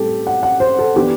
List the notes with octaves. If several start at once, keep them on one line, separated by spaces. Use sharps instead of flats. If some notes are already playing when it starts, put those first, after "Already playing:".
Already playing: A2 G3 C4 G4 A4
F#5
F#5
C5
A4
E3 B3 D4 G4